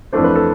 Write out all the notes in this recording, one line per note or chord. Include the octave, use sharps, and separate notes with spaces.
F2 E3 A3 D4 C5
B4
A4